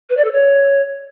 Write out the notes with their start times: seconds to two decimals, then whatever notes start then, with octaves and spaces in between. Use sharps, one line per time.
0.09 B4
0.17 D5
0.24 A4
0.32 C#5